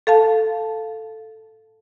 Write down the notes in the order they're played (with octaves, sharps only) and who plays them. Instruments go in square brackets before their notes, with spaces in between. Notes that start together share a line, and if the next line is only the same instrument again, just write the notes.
[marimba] A4 F5 A5